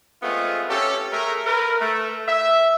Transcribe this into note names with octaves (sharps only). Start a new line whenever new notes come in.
G#3 A3 B3 C4 F4 G#4
C#4 G4 A4
A3 G#4 A#4
A#4 B4
A3
E5